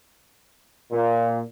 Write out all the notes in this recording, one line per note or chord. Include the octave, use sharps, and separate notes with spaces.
A#2